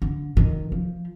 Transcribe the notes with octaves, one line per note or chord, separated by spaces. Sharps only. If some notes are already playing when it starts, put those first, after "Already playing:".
D3
D#3
F3